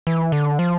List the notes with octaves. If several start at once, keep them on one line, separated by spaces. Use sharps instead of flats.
E3
D3
F3